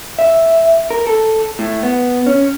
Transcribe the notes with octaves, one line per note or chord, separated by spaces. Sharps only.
E5
A#4
A4
A2
B3
C#4